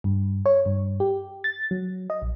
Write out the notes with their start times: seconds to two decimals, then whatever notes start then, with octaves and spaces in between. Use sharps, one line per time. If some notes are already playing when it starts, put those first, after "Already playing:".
0.04 G2
0.46 C#5
0.66 G2
1.00 G4
1.44 A6
1.71 F#3
2.10 D#5
2.22 A#1